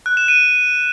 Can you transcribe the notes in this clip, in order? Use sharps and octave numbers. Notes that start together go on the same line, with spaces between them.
F#6
E7
D#7